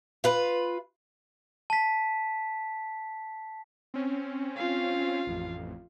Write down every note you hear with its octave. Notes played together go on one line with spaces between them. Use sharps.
F4 B4
A5 B6
C4 C#4
F4 F5
A1 F2